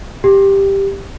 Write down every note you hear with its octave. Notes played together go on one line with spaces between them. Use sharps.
G4